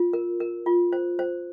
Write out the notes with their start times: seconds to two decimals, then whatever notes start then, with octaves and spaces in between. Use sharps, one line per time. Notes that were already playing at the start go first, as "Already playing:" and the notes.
Already playing: F4
0.13 A#4
0.40 A#4
0.66 F4
0.93 C5
1.19 C5